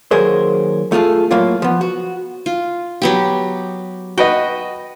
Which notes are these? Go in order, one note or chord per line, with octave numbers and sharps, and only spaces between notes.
D#2 F#3 G#4 A#4 C5
A3 F4 G#4 A4
A2 F#3 A#3 F4
F3 B3
F#4
F4
F#3 B3 G4
F#4 B4 D#5 G5